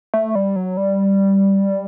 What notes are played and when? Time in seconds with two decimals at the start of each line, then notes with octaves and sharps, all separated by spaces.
0.14 A3
0.35 G3
0.56 F#3
0.77 G3